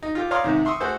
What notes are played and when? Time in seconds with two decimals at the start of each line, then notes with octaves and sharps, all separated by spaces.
0.03 D#4
0.15 F4 G4 A4
0.31 C#5 D5 F5 A#5 C6 D#6
0.44 G#2 C3 D#3
0.65 E5 C6 C#6 D#6 E6
0.81 A3 F#4 G#4 A4 C5